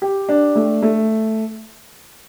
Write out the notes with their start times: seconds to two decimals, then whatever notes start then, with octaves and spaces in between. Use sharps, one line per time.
0.02 G4
0.29 D4
0.55 A3
0.82 A3